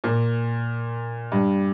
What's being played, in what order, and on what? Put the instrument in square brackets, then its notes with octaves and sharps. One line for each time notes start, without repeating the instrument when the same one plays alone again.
[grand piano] A#2
G2